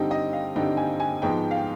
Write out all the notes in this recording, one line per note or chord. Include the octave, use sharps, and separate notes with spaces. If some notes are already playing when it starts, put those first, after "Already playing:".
Already playing: G2 D3 G3 C4 D#4 G5
D#5
F5
G2 D3 G3 C4 D#4 G5
G#5
G#5
G#2 F3 G#3 B3 D#4 G5
F5
G5